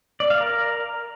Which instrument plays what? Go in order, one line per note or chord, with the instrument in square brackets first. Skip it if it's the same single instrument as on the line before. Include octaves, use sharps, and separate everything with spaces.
[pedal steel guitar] D5
F5
A#4